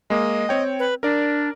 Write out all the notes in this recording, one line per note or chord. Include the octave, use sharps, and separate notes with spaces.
G#3 A#3 D#5
C4 C#5 G5
B4
D4 A#4 D5